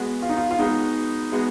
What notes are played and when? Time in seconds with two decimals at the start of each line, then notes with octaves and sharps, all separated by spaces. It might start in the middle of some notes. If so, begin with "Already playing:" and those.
Already playing: G#3 B3 F#4
0.22 F4
0.29 D#4
0.37 F4
0.51 F4
0.59 G#3 B3 D#4 F#4
1.32 G#3 B3 F#4